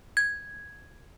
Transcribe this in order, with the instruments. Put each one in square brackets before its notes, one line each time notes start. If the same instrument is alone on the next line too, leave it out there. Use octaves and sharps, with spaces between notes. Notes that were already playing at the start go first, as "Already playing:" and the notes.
[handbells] G#6